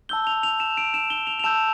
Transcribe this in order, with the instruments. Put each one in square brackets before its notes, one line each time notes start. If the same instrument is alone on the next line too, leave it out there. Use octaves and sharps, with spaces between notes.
[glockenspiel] A5 E6 G6 G7
F7
F7
E7
D7
E7
G7
F7
F7
A5 E6 G6 E7